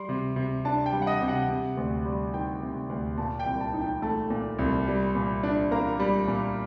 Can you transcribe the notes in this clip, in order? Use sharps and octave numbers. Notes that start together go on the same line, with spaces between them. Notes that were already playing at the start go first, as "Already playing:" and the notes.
Already playing: G3 C6
C3
C3
D4 A5
G5
G3
F#5
D#5
C3
F#5
C3
D2
G3
D#3 G5
C3
D2
A#2 A5
G5
C2
A5
D#4
G5
A3 A5
A#2
C2
G3
A#2
D4
A#3 A#5
G3
A#2